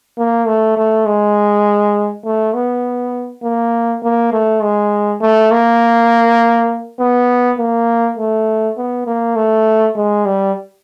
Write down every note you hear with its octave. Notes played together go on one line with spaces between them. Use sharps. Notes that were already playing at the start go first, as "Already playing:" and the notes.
A#3
A3
A3
G#3
A3
B3
A#3
A#3
A3
G#3
A3
A#3
B3
A#3
A3
B3
A#3
A3
G#3
G3